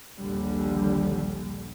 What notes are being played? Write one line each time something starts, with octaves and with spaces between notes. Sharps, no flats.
A#1 D#2 D3 G3